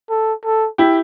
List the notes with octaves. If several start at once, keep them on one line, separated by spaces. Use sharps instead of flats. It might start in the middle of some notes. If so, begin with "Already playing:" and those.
A4
A4
E4 G4